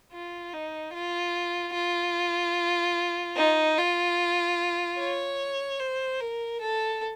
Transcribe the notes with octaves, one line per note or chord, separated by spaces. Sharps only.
F4
D#4
F4
F4
D#4
F4
C#5
C5
A#4
A4